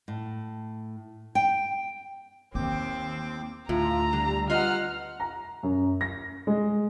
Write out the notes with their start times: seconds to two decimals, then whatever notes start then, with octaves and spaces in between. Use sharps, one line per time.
0.08 A2
1.35 G5
2.55 D#2 D#3 A#3 C4 G5 D6
3.69 D2 A2 F4 A#5
4.13 D3 G3
4.50 F4 B4 D#5 F#5 F6
5.20 A#5
5.63 F#2
6.01 A#6
6.47 G#3